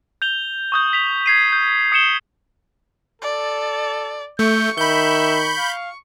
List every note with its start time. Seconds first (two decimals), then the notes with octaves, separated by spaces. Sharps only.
0.22 G6 F7 G7
0.72 C#6 D#6 G6
0.93 B6 F7
1.26 G#6 C7 D#7
1.52 G6
1.92 D#6 C7 C#7 E7 G7
3.22 A4 D5
4.39 A3 C#6 G6
4.78 D#3 E5 B5 G6
5.58 F5